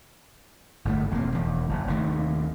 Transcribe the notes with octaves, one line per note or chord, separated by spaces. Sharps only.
G1 A2 C#3 A3
E1 F2 G#3 A#3
E1 E2
F#1
F1 D#2 D#3 A3